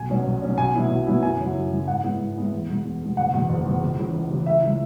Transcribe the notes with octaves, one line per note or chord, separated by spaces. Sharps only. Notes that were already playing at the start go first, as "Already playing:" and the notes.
Already playing: B1 G#5
B2 F#3 C#4
B1
B2 F#3 C#4
B1 G#5
B2 F#3 B3 E4
B1
B2 F#3 B3 E4
F#2 G#5
C#3 F#3 E4
F#2
C#3 F#3 E4
G#2 F#5
G#3 B3 E4
G#2
G#3 B3 E4
E2
B2 G#3
E2
B2 G#3
F#1 F#5
E2 B2
F#1
E2 B2
C#2
C#3 E3
C#2
C#3 E3
C#2 E5
C#3 G#3 E4